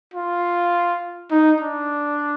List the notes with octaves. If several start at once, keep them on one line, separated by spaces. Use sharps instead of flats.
F4
D#4
D4